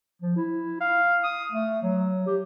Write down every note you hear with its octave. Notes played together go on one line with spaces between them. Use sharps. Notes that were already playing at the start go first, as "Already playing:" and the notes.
F3
E4
F5
D#6
A3
F#3
G4